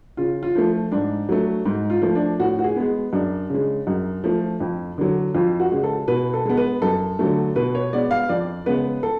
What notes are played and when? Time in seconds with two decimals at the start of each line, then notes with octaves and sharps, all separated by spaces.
0.17 C#3 F4
0.43 F4
0.55 F3 A3
0.92 G#2 D4
1.29 F#3 A3
1.66 G#2
1.90 F4
2.02 F3 A3
2.15 D4
2.40 A2 F#4
2.59 F#4
2.64 G#4
2.76 G#3 B3
3.13 F#2 D4
3.50 C#3 G#3
3.87 F#2
4.24 F3 A3
4.60 F2
4.98 D3 F#3
5.34 F2 F4
5.60 F#4
5.72 C#3 G#3
5.84 A4
6.08 B2 B4
6.33 A4
6.45 G#3 B3
6.57 B4
6.82 F#2 A4
7.19 D3 F#3 A3
7.56 B2 B4
7.75 C#5
7.93 G#3 B3 D5
8.11 F5
8.29 F2 D5
8.66 C#3 G#3 B3 B4
9.03 A4